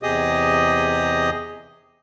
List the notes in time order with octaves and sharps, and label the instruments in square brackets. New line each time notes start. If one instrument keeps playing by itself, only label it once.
[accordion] E2 C3 G4 G#4 D#5 D#6